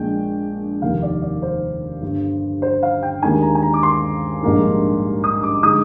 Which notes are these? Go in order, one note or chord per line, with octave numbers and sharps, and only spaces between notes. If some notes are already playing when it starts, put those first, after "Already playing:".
Already playing: A#1 A#2 G#3 D4 G5
F1 D#2 D#3 F5
D5
D5
C5
G1 G2 D3
C5
F5
G5
D#2 D#3 G#3 D4 G#5
A#5
G#5
A#5
D6
C6
A#1 G#2 G3 A#3 D4
D#6
D6
D3 G#3 D#4 D#6